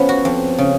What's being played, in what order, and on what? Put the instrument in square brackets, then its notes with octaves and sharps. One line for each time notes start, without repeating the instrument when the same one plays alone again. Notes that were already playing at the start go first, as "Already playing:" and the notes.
Already playing: [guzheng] F3 B3 C#4
F#4
F2
C#3